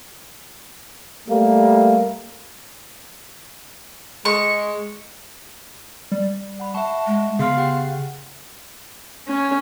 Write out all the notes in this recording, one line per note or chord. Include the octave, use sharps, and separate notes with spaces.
G3 A3 A#3
G#3 C#6
G3
F#5 B5
E5 F#5 A5 C#6
G#3
C#3 B3 F5 C6 F6
G4 F#5 G5
C#4